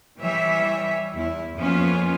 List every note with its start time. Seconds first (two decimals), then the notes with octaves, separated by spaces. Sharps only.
0.20 E3 G3 C#5 E5
1.14 E2 E4
1.57 F2 A#3 B3 C#4 F4